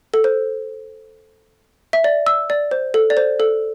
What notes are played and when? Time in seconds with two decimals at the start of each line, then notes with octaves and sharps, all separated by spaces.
0.14 A4
0.24 C5
1.93 E5
2.04 D5
2.27 E6
2.50 D5
2.71 C5
2.94 A4
3.10 D5
3.17 C5
3.40 A4